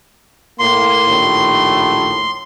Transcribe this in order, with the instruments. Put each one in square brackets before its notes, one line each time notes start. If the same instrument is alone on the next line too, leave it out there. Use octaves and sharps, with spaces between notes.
[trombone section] A2 A#3 [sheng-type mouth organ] C6
[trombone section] A#1 D#2 A2